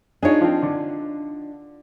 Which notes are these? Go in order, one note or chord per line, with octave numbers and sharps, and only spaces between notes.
D4 D#4 F4 G#4 C#5
F3 C4
D3